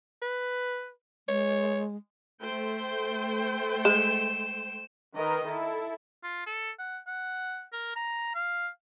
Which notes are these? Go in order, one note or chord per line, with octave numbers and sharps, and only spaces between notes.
B4
G#3 C#5
A3 C5 G5
G#3 E7
D#3 A#4 B4 D#5
E4 A4
F4
A4
F#5
F#5
A#4
A#5
F5